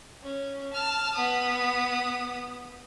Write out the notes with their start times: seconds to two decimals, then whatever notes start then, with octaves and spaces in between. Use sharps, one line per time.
0.22 C#4
0.73 A5 F6
1.15 B3 D#6